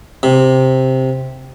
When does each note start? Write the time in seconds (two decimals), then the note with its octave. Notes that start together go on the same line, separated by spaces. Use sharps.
0.23 C3